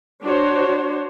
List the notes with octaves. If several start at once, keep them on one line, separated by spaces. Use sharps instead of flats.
D4 F#4 C5 C#5